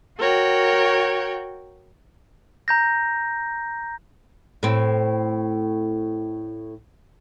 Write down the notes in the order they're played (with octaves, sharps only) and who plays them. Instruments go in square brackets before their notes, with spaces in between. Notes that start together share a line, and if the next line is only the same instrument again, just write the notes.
[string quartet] F#4 A#4 C#5 G5
[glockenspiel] A#5 G6 A#6
[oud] A2 C4